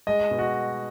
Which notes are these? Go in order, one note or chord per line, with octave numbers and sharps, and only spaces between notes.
G#3 D#5
B2
F#4